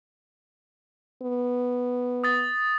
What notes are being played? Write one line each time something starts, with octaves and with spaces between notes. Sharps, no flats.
B3
D#6 A6